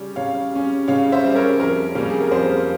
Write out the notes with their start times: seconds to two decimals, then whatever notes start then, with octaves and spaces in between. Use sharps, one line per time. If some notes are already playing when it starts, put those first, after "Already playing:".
Already playing: C#3 G3 C#4
0.16 C#3 C#5 F5
0.53 G3 C#4
0.88 C#3 C#5 F5
1.12 C5 E5
1.24 G3 C#4
1.36 A#4 C#5
1.60 F2 A#4
1.95 C#3 G3 A#3 C#4
2.10 G#4
2.20 A#4
2.31 F2 G#4 C5